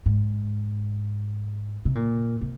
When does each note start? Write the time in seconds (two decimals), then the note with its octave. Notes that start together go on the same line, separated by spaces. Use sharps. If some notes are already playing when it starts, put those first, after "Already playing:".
0.06 G#2
1.85 C3
1.95 A#2
2.41 C3